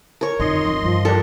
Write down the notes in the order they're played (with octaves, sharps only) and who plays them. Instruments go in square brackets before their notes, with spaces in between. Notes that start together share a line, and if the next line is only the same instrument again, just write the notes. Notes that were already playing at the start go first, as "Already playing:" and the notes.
[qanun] A#4 C#5
[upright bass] F2 D3 [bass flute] D#4 [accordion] D#5 C6
[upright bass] F2 F3
[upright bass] G2 E3 [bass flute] F3
[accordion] D4 G4 [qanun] A4 A#4